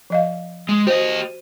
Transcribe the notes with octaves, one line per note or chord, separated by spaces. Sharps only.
F3 D#5 F5
G#3
F#4 G4 C5 D#5